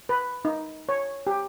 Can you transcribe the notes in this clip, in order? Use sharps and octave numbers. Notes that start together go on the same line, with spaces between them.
B4
D#4
C#5
G4